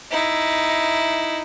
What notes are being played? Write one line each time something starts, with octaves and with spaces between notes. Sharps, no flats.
D#4 E4